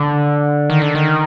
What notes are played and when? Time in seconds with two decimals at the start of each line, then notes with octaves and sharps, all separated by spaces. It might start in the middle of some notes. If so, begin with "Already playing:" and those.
Already playing: D3
0.70 D#3
0.82 D3
0.95 D#3